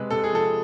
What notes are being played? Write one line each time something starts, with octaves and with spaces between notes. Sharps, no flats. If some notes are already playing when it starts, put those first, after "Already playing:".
Already playing: C3 G#3 B4
C3 A4
G#4
F3 A4